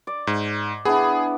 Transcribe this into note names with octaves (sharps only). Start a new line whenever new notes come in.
D5
G#2
B3 D4 E4 G#4